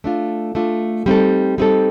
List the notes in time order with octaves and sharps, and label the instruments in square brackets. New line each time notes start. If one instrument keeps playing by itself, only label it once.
[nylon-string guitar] A3 D4 F4
A3 D4 F4
G3 C4 D#4 A4
G3 C4 D#4 A4